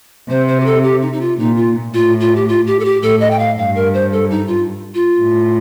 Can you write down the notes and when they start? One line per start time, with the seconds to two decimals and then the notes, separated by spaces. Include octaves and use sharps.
0.30 C3 C5
0.48 C5
0.60 G4
0.66 A4
0.83 G4
1.02 D#4
1.12 D#4
1.21 F4
1.39 A#2 D#4
1.57 F4
1.93 A2 F4
2.20 F4
2.36 G4
2.48 F4
2.67 G4
2.80 A4
2.85 G4
3.02 A2 A4
3.20 D#5
3.31 G5
3.39 F5
3.57 G2 F5
3.75 A#4
3.94 C5
4.12 A4
4.30 D#4
4.48 F4
4.94 F4
5.21 A2